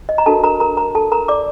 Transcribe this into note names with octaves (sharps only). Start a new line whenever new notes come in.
D#5
A#5
D4 F#4 A4 A#4 A5
A#4 A#5
A#4 A#5
A#4 A#5
A4 A5
A#4 A#5
D5 D6